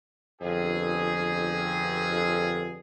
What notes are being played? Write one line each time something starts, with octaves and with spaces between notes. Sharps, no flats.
G1 F2 G#4